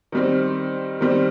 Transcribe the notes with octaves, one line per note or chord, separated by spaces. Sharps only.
D#3 G3 C4
D#3 G3 C4